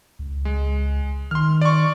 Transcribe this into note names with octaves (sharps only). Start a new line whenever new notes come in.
C#2
G#3
D#3 C6 F6
D5 C#6